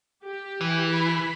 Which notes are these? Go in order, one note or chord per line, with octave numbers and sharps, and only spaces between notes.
G4
E3
B5